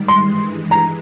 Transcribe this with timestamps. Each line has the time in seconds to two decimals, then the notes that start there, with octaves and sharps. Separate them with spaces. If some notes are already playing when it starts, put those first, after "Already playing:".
Already playing: G#2 D#3 G3
0.08 C6
0.24 G2 E3 G#3
0.71 A#5